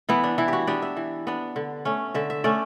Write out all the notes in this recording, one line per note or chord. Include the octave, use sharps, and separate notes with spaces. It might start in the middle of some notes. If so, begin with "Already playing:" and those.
E3 B3 E4
D4
E3 E4
F#4 G4
B3 D4 G4
E5
E3
B3 D4
D3
A3 C#4
D3 E5
E5
A3 C#4 D5